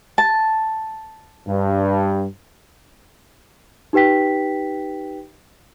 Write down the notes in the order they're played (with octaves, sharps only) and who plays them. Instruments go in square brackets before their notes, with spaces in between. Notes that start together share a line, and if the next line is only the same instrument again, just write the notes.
[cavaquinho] A5
[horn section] G2
[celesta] D#4 G4 B4 G5 B6